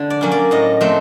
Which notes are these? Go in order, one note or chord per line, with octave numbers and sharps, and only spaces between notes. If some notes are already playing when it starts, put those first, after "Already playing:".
Already playing: D3
D5
F#3 A#3 C#4
D5
A2 D#5
F#3 A3 C4